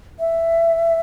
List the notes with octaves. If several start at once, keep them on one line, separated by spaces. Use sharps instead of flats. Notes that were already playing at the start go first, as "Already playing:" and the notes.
E5